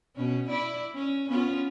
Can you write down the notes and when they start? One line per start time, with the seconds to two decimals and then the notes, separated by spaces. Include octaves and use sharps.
0.16 B2 C#4
0.50 E4 D5
0.95 C#4
1.28 B3 C#4 F4